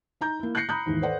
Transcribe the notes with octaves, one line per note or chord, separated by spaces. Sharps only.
D#4 A#5 G6
A#3 E4
F#6 G6 A#6 C7 C#7
A#5 B5 D#6 F#6 G6
D#2 G#2 D#3 E3
A4 B4 C5 D5 F#5